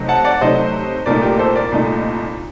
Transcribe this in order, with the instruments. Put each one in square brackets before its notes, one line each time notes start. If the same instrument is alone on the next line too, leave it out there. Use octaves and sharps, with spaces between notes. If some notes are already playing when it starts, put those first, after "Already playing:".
Already playing: [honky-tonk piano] C3 F#3 A3 D#4
[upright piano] F#5 A5
D5 F#5
[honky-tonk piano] C3 F#3 A3 D#4 [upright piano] C5 D#5
[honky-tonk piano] C2 A#2 A3 D#4 [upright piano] A#4 D5
[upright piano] G4 A#4
A4 C5
A#4 D5
[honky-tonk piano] C2 A#2 A3 D#4